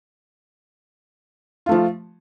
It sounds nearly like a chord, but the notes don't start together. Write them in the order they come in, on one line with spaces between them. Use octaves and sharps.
F4 A3 F3